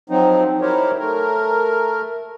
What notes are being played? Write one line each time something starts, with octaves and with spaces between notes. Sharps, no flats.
F3 F#3 C4 D#4
D#4 E4 G4 A#4 C5 C#5
A3 A#4